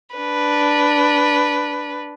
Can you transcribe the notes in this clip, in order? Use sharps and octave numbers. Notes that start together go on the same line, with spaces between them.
D4 B4